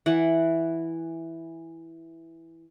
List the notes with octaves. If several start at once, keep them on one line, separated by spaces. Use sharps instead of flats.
E3 F#5